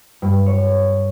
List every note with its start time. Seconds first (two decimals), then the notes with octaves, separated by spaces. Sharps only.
0.22 G2
0.46 C#5